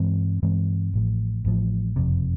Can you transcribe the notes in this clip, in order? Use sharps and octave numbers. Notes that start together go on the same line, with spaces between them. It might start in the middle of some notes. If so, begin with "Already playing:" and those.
Already playing: G2 E3 G#3 C4
G2 E3 G#3 C4
A1 A2 F3
A1 A2 F3
F#1 F2 C3